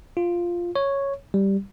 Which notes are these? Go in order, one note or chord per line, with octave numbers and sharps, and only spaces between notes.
F4
C#5
G3